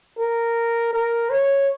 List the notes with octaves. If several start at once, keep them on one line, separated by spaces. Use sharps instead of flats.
A#4
A#4
C#5